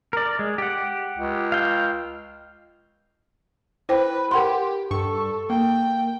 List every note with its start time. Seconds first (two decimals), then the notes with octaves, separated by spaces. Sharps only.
0.13 A#4 D5
0.39 G#3
0.58 G4 F#5
1.18 C#2
1.52 F5 G5
3.89 E4 B4 C5 G5
4.31 G4 A#4 F#5 C6
4.91 G2 A4 C#6
5.50 A#3 G5